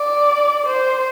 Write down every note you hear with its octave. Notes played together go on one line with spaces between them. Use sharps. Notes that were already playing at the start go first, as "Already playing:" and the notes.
Already playing: D5
C5